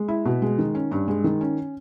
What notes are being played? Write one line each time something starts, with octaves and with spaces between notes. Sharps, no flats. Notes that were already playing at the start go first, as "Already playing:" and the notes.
Already playing: G#3
E4
B2
G#3
D#3
C#4
G2
G#3
D#3
C#4